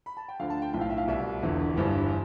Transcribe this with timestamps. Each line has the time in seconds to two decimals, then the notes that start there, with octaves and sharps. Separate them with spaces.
0.06 B5
0.17 A5
0.28 G5
0.39 D2 D3 F3 F5
0.50 A5
0.62 G5
0.73 B1 A2 F3 G5
0.81 F5
0.90 E5
0.98 F5
1.07 C2 B2 G3 E5
1.42 E1 E2 D3 F3
1.77 G1 G2 E3 G3 C5